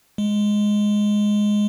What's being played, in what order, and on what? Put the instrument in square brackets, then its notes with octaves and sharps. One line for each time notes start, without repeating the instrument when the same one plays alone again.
[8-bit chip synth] G#3